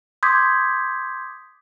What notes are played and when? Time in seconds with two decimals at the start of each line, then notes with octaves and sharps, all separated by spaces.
0.23 C6 D6 D#6 G6 G#6 B6